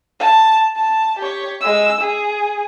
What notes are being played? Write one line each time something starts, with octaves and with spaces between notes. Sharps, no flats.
A5
A5
G4 C#5
G#3 E6
G#4